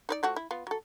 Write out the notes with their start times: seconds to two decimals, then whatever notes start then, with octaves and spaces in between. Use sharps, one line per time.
0.09 D#4 B4 D5
0.23 F3 A3 F#4
0.36 E4
0.51 B3 F4
0.67 F#3 A4